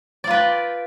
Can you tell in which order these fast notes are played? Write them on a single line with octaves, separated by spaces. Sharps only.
D5 F4 B4 G5